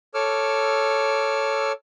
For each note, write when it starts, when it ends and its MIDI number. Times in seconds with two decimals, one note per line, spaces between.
0.14 1.72 69
0.14 1.72 73
0.14 1.72 86
0.14 1.72 88
0.14 1.72 89